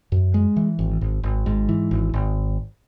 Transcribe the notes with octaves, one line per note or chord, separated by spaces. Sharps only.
F#2
G#3
E3
G#1
G#1
G#1
G#2
E3
G#1
G#1